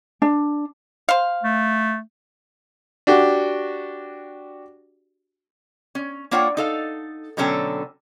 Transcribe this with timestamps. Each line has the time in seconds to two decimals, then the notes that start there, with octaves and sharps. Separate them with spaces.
0.22 D4
1.09 C5 F5
1.43 A3
3.07 D4 F#4 G4
5.95 C#4
6.31 A#3 D4 F4 C#5 F#5 G5
6.57 D#4 A4 F5
7.37 B2 D3 F#3 C#4 A4 G5